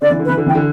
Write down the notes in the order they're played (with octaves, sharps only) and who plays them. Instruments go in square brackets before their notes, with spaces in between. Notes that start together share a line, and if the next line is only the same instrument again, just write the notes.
[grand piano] D3 [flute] D5
[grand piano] E3
D3
[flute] B4
[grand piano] E3
D3
[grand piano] E3 [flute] G5
[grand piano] D3